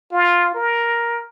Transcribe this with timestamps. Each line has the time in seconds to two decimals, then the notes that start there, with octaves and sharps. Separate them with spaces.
0.12 F4
0.54 A#4